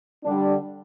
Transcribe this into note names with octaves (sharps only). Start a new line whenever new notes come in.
D3 G3 D4